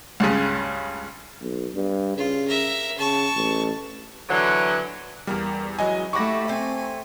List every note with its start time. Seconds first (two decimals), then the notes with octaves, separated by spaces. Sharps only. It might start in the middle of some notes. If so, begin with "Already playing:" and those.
0.20 C#2 G2 C#3
1.42 B1
1.75 G2
2.17 C#3 F4
2.48 A#4 E5
2.98 C#3 A5 C#6
3.35 A1
4.29 D3 E3 F#3
5.27 E2 G3 A#3 A#4
5.79 E3 F#3 G#3 C#4 D#5 G#5
6.13 A3 E4 G4 F#5 C#6 D6 A#6
6.48 A3 C4 G#5